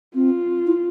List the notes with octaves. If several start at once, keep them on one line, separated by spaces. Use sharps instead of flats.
C4 F4
E4